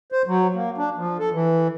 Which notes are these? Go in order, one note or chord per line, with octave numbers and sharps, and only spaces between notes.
C5
F#3
A#3
D4
F3
A4
E3